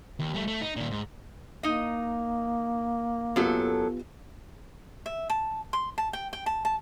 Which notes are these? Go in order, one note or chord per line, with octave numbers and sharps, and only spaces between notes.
D#2
G3 A3
A3
D#4
A#2 D#3
G#2
A#3 D#4 D#5
F#2 F#3 B3 F4 G4 A4
E5
A5
C6
A5
G5
G5
A5
A5